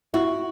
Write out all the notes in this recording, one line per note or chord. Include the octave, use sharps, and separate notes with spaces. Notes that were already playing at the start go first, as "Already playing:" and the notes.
E4 F#4